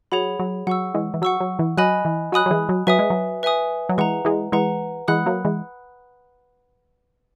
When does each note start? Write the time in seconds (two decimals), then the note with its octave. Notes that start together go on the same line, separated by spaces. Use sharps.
0.12 F#3 G#4 C#5 F#5 B5
0.40 F#3
0.67 F#3 F#5 C#6 E6
0.94 E3 G#3
1.14 E3
1.22 F#3 F#5 C#6 E6
1.41 F#3
1.59 E3
1.77 F#3 D#5 G#5 B5 D#6 F#6
2.05 E3
2.32 F#3 D#5 G#5 B5 D#6 F#6
2.46 F#3
2.51 E3 G#3
2.69 F#3
2.87 F#3 B4 E5 G#5 D#6
2.99 G#3
3.10 F#3
3.43 B4 E5 G#5 D#6
3.89 F#3
3.98 E3 G#3 B4 F#5 A#5
4.25 E3 G#3
4.52 E3 G#3 B4 F#5 A#5
5.08 E3 G#3 F#5 B5 D#6 F#6
5.26 F#3 A#3
5.45 E3 G#3